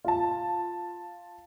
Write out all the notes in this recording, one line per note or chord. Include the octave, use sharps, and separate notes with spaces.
F4 A5